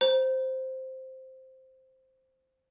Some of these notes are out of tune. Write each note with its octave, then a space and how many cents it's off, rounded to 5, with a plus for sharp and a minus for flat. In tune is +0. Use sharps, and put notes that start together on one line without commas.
C5 +0 A#5 +35